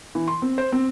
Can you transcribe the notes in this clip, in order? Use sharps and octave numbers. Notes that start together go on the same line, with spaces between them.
E3
C6
C4
C5
C4